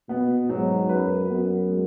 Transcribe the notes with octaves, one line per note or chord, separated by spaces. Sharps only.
B2 B3
G#2 F#3
F#2 B4
F#2 B3
G#3